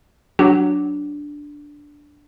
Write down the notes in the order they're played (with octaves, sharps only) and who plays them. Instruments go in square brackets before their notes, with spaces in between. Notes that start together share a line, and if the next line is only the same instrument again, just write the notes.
[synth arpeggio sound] F#3 [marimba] D4